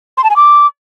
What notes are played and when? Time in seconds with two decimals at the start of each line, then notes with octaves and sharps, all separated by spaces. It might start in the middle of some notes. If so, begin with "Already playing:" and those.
0.17 C6
0.24 A5
0.30 G#5
0.36 D6